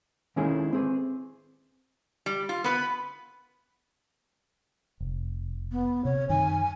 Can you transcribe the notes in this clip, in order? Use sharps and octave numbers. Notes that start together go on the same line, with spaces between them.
D#3 G#3 C#4 E4 G#4 A4
C4 G#4 B4
G3
F4
B3 B4 B5
F1
B3
C3 C#5
F#2 D#3 G#5